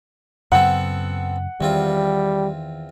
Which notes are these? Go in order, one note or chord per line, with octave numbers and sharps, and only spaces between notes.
F#2 C#3 F#3 B3 C4 A4 F#5
E2 D#3 G3 C4 F4